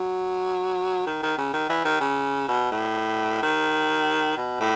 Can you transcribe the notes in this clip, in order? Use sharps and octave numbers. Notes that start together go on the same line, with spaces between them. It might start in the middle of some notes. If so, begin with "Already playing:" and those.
Already playing: F#3
D#3
D#3
C#3
D#3
E3
D#3
C#3
B2
A2
D#3
B2
A2